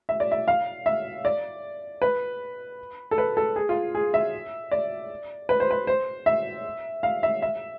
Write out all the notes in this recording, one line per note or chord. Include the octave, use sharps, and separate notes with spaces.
E5
D5
E5
F5
E5
D5
B4
A4
B4
A4
G#4
F4
G#4
E5
D5
B4
C5
B4
C5
E5
F5
E5
E5